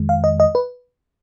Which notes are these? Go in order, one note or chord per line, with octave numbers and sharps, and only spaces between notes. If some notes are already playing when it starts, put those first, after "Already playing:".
Already playing: F2 D#3 G#3
F5
D#5
D#5
B4